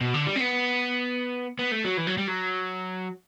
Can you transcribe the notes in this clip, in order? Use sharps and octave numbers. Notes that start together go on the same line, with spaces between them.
B2
D3
G3
C4
B3
B3
A3
F#3
E3
F#3
G3
F#3